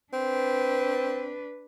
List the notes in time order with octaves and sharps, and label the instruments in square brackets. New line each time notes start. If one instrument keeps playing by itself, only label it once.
[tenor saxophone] C4 [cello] D4 B4